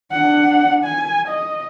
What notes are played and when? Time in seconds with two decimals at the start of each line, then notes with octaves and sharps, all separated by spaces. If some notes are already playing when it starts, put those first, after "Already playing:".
0.12 D4 F#5
0.85 G#5
1.29 D#5